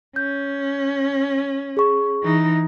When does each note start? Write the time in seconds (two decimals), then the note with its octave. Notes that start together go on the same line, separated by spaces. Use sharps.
0.16 C#4 G6
1.77 G#4 C#6
2.23 E3 D#4